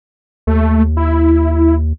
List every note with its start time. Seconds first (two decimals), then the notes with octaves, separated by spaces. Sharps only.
0.47 D#2 A3
0.97 E4